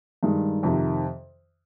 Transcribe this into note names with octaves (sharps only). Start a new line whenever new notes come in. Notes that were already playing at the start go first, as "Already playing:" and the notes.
G2 D#3 G#3
F2 C3 D#3